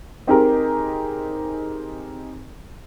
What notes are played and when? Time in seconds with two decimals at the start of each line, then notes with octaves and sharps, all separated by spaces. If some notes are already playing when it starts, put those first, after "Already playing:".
0.27 C4 D#4 G4 G#4 A#4 A#5